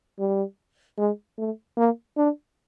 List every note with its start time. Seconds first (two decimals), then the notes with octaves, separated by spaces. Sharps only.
0.19 G3
0.98 G#3
1.38 A3
1.77 A#3
2.17 D4